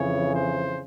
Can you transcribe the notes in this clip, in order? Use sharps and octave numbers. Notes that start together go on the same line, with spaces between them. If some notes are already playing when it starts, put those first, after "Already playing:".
Already playing: F2 C#3 E3 C#5
C5